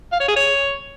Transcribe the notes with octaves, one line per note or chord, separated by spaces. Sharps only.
F5
C#5
G#4
C#5